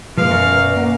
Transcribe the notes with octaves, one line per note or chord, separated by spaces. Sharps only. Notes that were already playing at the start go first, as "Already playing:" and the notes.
F#2 B2 F3 G#3 A#3 B4 F5
D5 A#5 C#6
A#3 F#5